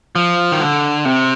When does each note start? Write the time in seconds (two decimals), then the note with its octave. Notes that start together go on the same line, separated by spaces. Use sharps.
0.16 F3
0.52 D#3
0.61 D3
1.05 C3